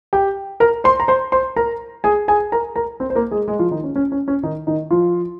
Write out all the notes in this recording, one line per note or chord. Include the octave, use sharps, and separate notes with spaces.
G4 G5
A#4 A#5
C5 C6
A#5
C5 C6
C5 C6
A#4 A#5
G#4 G#5
G#4 G#5
A#4 A#5
A#4 A#5
C4 C5
C5
A#3 A#4
G#3 G#4
G#3 G#4
F3 F4
D#3 D#4
C#4
C#4
C#4
C#4
D#3 D#4
D#3 D#4
F3 F4